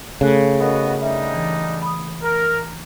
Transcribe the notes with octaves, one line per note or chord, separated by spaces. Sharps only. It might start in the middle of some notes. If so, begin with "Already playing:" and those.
C#3 A3 A4 F#6
B3 F#4 A#4 D#5
G3 D4 D#4 E5
E3
B5 D#6
A#4